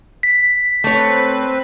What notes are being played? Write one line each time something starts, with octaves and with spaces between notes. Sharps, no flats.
B6
A3 C4 B4 C#5